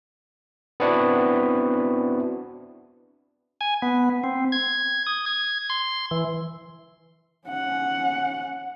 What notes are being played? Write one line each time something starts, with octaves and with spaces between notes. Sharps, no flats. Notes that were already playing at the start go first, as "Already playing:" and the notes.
B3 C4 D4 E4 F#4
G#5
B3
C4
G#6
D#6
G#6
C6
E3
C#4 F#5